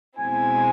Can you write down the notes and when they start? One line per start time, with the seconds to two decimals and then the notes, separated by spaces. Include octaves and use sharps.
0.19 E2 B2 G#3 C4 E4 G#5